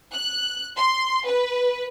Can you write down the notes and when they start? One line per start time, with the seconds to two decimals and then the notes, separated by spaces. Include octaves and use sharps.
0.12 F#6
0.76 C6
1.26 B4